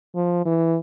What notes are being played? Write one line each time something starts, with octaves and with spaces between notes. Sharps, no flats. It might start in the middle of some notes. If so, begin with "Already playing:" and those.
F3
E3